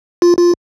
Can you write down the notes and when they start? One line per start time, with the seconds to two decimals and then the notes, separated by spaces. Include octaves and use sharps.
0.22 F4
0.38 F4